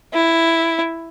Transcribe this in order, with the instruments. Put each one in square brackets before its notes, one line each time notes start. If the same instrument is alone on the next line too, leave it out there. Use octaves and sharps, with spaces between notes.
[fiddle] E4